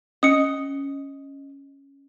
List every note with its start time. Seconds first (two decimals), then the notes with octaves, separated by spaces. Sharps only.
0.23 C#4 D#5 D#6 C#7